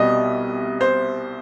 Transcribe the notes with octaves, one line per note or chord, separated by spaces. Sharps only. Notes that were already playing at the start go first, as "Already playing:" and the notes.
Already playing: C2 B2 G3 D#5
C5